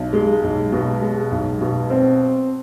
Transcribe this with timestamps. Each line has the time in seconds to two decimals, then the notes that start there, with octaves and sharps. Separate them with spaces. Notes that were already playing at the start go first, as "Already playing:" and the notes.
Already playing: B1
0.13 G#3
0.43 B1
0.72 B2
1.02 G#3
1.32 B1
1.61 B2
1.90 C4